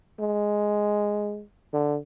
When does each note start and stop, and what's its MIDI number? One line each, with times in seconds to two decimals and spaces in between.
0.20 1.42 56
1.74 1.98 50